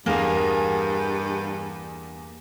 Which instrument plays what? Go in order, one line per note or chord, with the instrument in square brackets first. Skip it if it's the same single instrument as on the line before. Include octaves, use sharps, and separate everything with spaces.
[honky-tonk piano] E2 G#4 [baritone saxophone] G2 [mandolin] A#3 A#4